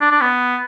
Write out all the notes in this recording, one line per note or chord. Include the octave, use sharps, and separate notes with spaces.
D4
D4
B3